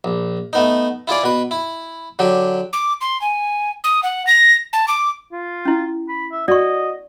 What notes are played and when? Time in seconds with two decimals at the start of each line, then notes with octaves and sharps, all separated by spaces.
0.04 A#1
0.53 A3 B3 D#4
1.08 E4 F4 G#4 D5
1.23 B2 B4
1.51 E4
2.19 D3 F#3 G4
2.73 D6
3.01 C6
3.22 G#5
3.84 D#6
4.03 F#5
4.27 A#6
4.73 A5
4.88 D6
5.32 F4
5.65 C#4 E4
6.09 B5
6.32 E5
6.48 F#4 D5 D#5 C#6